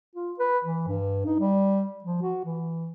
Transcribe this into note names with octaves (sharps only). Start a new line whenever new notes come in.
F4
B4
E3
G2
D#4
G3
F3
F#4
E3